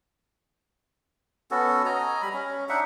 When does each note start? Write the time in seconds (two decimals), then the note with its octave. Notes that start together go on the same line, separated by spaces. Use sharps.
1.51 B3 C#4 F#4 A4
1.86 D#5 G#5 A#5
2.22 G3 B5
2.33 C#4
2.69 D4 D#4 E5 F#5